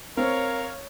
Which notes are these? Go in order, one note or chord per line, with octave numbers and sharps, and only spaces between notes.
C4 A#4 C#5 F5